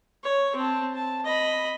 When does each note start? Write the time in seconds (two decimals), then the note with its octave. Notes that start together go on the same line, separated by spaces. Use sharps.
0.24 C#5
0.56 C4 A5
0.95 A5
1.25 D#5 B5